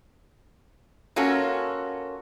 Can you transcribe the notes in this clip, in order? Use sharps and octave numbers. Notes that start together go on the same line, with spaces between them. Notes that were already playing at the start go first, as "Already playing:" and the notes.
A#3 C#4 F4 F#4 A4